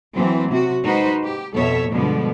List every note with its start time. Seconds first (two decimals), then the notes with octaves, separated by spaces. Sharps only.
0.14 E3 F#3 C4
0.50 C3 F#4
0.83 G#3 D#4 F#4 B4 C5
1.22 G4
1.53 F2 B2 A4 C#5 E5
1.91 G2 B2 D3 F3 G#3 B3